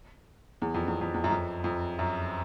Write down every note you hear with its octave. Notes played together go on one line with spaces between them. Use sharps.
E2
F2
E2
F2
E2
F#2
F2
F2
F#2